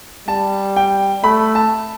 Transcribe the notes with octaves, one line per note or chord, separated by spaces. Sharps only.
G3 A5
G5
A3 B5
A5